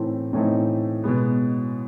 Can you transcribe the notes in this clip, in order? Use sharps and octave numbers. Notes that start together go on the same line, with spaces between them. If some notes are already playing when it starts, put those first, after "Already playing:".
Already playing: A2 E3 A3 C4 D#4
A2 E3 A3 C4 D#4
B2 G#3 B3